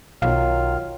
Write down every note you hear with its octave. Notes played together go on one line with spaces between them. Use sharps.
B1 D#3 F#3 F4 F5 F6